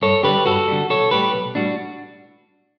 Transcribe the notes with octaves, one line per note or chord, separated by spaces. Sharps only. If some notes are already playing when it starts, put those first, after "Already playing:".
G2 A4 C#5
D3 G3 G4 B4
G2 F#4 A4
D3 G3
B1 A4 C#5
A2 G3 G4 B4
B1
A2 G3 D4 F#4